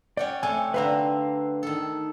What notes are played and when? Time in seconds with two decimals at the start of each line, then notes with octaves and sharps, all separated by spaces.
0.17 C#4 D5 F#5 G5
0.43 C3 A3 G#5
0.74 D3 C4 D4 B4 F5 A#5
1.63 D#3 A4